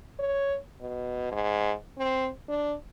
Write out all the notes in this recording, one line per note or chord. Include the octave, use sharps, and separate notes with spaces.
C#5
B2
G#2
C4
D4